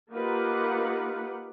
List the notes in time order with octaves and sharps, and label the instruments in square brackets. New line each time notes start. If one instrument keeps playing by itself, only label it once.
[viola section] A#3 D#4 F4 G4 B4 F#5